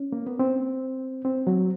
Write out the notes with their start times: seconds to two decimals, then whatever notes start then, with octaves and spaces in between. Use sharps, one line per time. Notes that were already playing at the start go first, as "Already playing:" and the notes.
Already playing: C#4
0.12 A#3
0.27 B3
0.39 C4
1.25 C4
1.47 F#3